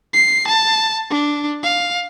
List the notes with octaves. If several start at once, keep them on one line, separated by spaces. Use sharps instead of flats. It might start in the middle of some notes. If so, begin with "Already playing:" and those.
C7
A5
D4
F5